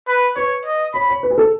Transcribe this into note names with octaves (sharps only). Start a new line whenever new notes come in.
B4
B4 C#5
D#5
C#5 B5
C#5
B4
G#4
A4